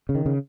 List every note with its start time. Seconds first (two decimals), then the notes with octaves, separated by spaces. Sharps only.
0.09 C#3
0.15 D#3
0.26 C#3